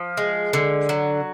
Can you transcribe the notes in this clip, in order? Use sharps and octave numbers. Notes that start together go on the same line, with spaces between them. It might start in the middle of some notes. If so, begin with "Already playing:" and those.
Already playing: F3
G#3
D3
F#3